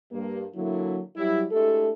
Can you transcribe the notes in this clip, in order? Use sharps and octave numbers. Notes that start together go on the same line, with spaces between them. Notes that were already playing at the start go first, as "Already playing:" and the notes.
G2 A#3
D3 F#3 A#3 D4 E4
F#3 G3 E4
G#3 A3 D4 E4 G4 A4